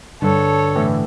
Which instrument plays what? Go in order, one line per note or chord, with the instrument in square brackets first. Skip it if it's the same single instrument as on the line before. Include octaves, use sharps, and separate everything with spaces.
[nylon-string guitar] G2 [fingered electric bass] D3 [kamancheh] A4 C#5
[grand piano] A2 E3